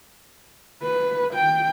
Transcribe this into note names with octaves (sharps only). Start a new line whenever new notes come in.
B4
G5